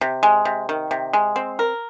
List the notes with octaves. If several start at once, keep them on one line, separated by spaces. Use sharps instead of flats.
C3
G#3
C3
D#3
C3
G#3
C4
A#4